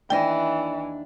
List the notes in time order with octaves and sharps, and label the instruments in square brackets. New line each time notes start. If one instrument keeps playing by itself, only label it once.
[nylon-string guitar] D#2 D4 D#5 [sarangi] E3 [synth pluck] G5